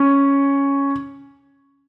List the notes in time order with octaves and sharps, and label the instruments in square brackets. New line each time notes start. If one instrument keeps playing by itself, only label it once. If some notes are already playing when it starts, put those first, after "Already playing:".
Already playing: [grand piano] C#4